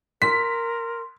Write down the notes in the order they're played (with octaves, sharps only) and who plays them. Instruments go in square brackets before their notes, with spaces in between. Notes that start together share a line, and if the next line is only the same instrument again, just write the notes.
[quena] A#4 [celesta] C6 [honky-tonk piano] B6